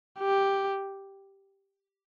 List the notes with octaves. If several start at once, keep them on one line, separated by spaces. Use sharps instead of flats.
G4